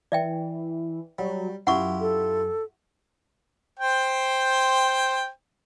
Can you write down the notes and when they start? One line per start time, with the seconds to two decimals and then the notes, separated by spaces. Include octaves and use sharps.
0.12 E3 D5 E5 G5
1.19 F#3 G3
1.67 F#2 E4 F4 G4 F#5 C#6
2.01 A4
3.79 C5 G5